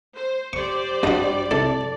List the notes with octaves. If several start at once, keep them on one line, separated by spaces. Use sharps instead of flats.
C5
G4 C5 D5 C#6
G2 G3 D4 F#4 D#5
C2 D4 A4 D5